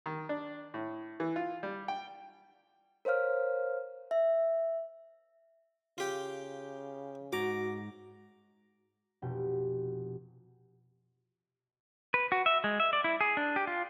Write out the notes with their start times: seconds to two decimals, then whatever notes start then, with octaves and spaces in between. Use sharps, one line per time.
0.06 D#3
0.29 D4
0.74 A2
1.20 E3
1.36 F4
1.63 G3
1.88 G5
3.05 A#4 C5 C#5 F5 F6
4.11 E5
5.98 C#3 F4 G4
7.33 G#2 F#4 A#5 D6
9.22 F1 B2 G5
12.14 B4
12.32 F#4
12.46 E5
12.64 G#3
12.80 E5
12.93 D5
13.04 E4
13.21 G#4
13.37 D4
13.56 G4
13.67 F4